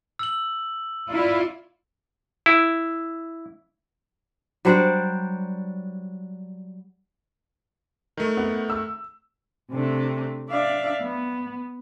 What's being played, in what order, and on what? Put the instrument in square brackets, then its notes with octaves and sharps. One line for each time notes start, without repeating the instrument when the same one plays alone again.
[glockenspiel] E6 F#7
[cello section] E4 F4 D5
[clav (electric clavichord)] E4
[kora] F#3 G3 D4 C5
[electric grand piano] D#3 A3
[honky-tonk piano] B3 F#5
E6
[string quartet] C3 A3 D4
D4 D5 E5 F5
B3